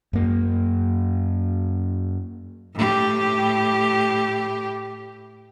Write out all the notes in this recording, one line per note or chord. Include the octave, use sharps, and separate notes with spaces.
F#2 A#3
A2 G4